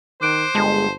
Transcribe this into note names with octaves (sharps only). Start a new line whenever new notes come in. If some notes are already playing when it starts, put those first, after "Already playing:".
D#3 C5 D6 F#6 D7
G1 G#3 A5